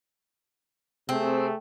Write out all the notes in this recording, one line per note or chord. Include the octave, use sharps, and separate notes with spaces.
C3 A3 C4 G#4